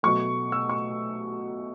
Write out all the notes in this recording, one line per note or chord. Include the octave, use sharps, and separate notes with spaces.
B2 F#3 A3 C#6
E6
C#6